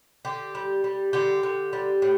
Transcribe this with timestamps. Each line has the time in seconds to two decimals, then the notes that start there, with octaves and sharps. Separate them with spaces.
0.25 D3 G4
0.55 G3
0.84 G3
1.13 D3 G4
1.43 D3
1.73 G3
2.02 A2